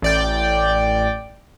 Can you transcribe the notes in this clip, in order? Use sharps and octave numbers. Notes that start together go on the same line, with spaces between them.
A1 D5 G5